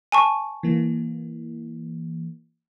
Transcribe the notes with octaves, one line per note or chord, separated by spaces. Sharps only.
G#5 A5 C#6
E3 A#3